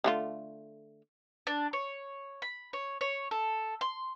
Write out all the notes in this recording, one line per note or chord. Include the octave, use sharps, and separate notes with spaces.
D3 A3 F4
D4
C#5
B5
C#5
C#5
A4
C6